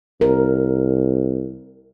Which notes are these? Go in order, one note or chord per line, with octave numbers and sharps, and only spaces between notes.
C2 A#4